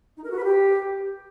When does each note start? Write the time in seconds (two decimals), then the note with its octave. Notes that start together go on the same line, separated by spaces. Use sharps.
0.16 D#4
0.23 A#4
0.30 F#4
0.36 B4
0.43 G4